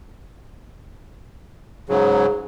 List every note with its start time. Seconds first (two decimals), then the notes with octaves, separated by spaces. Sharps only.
1.89 G#2 C#3 F#3 G#4